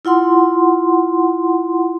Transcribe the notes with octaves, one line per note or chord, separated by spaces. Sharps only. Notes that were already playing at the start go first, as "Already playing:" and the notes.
E4 F4 F#5 C6